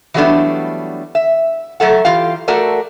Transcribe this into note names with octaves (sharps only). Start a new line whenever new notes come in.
E3 F#3 G3 A3 B3 D4
E5
F#3 A3 A4 F#5
E3 F4 G4 F5
A3 F#4 A4 A#4 D5